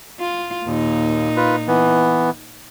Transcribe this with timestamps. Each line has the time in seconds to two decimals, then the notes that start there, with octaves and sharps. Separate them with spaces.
0.20 F4
0.66 D#2 A#2 D#4
1.36 F4 B4
1.67 E3 B3